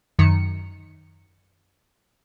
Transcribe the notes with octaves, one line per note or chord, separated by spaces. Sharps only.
F#2 D#3 C#7